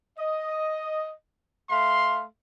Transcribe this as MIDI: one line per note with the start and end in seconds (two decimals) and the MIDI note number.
0.18 1.12 75
1.70 2.24 57
1.70 2.24 77
1.70 2.24 84